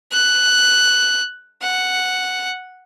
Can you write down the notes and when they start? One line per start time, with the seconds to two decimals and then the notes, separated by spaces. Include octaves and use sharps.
0.12 F#6
1.62 F#5